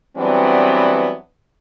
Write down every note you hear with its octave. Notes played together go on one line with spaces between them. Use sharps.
E3 F#3 G3 B3 C4 D4